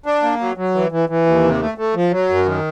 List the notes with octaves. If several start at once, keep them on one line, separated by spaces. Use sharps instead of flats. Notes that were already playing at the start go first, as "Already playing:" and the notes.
D4
A#3
F#3
F#3
E3
E3
E3
D#2
C3
A3
A3
F3
F#3
F#2
D#3